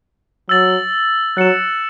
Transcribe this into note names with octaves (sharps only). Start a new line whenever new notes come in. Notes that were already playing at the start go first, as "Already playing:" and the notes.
F#3 E6 A6 F#7
F#3 F#6 C#7 E7